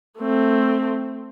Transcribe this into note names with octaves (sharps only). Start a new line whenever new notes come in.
A3 C4